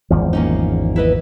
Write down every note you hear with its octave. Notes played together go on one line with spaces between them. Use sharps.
G#1 E2 F3
A#3 C#4 D#4
E4 B4 D#5